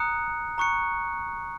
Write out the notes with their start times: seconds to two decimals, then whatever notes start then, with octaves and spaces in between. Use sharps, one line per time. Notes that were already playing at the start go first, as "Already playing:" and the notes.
Already playing: A#5 D#6 F#6 C#7
0.58 A#5 C#6 F#6 C#7